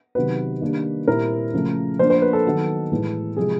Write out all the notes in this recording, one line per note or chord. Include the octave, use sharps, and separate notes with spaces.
C3 D#3 F#3 B3 B4
D#3 G3 A#3 D4
A#2 G3 C4 E4 A#4
C#3 F3 A3
F3 A#3 D4 C5
C5
B4
A4
D#3 F#3 B3
A2 E3 G#3
C3 F3 G#3 G#4